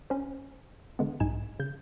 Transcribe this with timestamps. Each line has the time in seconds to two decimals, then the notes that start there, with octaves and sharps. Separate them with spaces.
0.10 C#4 C5
0.99 D3 G#3 B3
1.20 B1 G#2 D#4 G#5 E7
1.59 C#3 G6